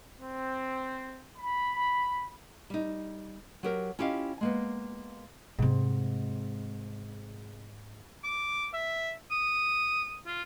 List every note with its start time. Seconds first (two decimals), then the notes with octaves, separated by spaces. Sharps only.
0.20 C4
1.38 B5
2.70 G3 D#4
3.63 F#3 G4 A#4
3.99 C#4 E4 F4 G4 D#5 F5
4.41 G#3 A#3 B3
5.58 G#2 C3 C4
8.24 D6
8.73 E5
9.31 D#6
10.26 F4